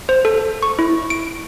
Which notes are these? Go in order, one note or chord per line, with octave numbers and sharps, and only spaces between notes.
C5
A4
C#6
E4
D7